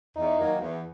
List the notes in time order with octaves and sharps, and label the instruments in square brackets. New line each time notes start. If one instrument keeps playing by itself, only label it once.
[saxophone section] E2 [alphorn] D#4
[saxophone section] D#3 F#3 A#3
E2